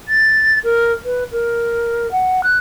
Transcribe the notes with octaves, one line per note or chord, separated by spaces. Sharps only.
A6
A#4
B4
A#4
F#5
F#6